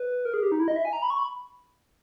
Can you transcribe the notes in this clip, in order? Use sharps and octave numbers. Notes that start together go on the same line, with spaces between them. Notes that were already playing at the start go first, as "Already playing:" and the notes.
Already playing: B4
A#4
G#4
G4
D#4
E4
D#5
E5
G#5
A#5
B5
C#6
B5